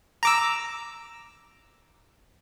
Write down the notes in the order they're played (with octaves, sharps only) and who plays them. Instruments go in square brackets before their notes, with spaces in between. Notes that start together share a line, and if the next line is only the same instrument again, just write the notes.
[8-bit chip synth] A#5 D6 E6